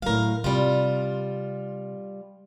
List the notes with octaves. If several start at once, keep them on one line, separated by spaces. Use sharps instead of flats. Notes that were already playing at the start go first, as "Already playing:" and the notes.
A2 F#3 A#4 F5
C3 G3 F4